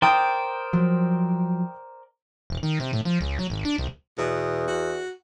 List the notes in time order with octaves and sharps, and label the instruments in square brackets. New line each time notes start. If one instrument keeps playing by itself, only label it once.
[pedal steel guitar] A#4 C5 D5 [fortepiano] G5 D#6
[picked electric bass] F3 F#3
[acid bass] E1
D#3
C3
A2
F3
C#2
F#3
G#1
D4
C2
[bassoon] E2 [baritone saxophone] B2
[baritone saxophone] F#4